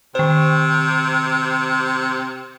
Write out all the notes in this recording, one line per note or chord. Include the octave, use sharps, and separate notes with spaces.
C3 D#3 C5